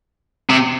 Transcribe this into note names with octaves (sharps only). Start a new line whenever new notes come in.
C3